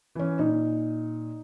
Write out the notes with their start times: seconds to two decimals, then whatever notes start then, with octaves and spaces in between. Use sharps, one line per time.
0.15 E3 C#4
0.39 A#2 D#4